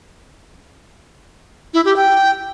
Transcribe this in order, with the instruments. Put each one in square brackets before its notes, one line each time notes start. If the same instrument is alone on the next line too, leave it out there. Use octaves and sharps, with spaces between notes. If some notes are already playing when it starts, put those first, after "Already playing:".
[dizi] E4
G4
G5